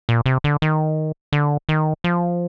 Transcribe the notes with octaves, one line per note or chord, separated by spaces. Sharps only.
A#2
C3
D3
D#3
D3
D#3
F3